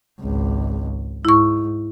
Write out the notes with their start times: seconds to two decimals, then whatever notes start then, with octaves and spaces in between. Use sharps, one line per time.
0.20 G#1 C#2
1.25 G#2 E4 C#6